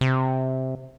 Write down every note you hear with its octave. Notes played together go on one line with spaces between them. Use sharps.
C3